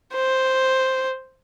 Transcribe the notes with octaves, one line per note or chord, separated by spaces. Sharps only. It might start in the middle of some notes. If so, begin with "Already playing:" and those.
C5